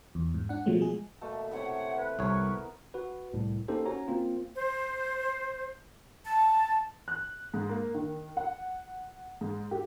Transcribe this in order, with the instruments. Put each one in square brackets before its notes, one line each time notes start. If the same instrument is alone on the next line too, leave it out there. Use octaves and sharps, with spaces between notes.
[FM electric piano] E2
G#2
D4 F#5
B2 F3 F#3 G#3 A3
G#3 G#4
[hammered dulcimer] B2 A3 A#3
[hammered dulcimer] C3 E4 [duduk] C#5 [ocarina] F#5
[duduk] B4
[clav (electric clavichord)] C2 C#5 [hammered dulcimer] B3 A#4 [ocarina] C#6
[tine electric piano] F#4 B4
C2 A2
A#3 C#4 D#4 G4 A4 C5
C#4 F#4 C#5 A#5
A#3 C4 F4
[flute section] C5
A5
[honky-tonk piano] F#6
G#2
A#3
D#3
F#5
G#2
G4